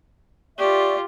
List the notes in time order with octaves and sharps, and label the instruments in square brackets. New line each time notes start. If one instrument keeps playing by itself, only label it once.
[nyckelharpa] F4 G4 [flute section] D5 E5 C#6